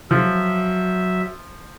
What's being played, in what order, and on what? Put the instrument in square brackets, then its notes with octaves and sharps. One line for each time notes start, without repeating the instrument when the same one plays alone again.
[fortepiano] F3 [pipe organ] F#3 E5